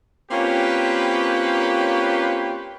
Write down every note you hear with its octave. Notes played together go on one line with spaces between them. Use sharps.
A#3 C4 C#4 F4 G4 B4